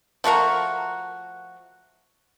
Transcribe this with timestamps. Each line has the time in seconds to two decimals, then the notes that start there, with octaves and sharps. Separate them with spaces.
0.24 F3 A3 F#4 A#4